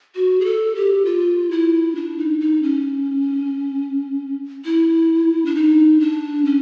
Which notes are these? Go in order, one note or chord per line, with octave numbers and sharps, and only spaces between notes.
F#4
G#4
A4
G4
F4
E4
D4
D#4
D#4
C#4
E4
D4
D#4
D4
C#4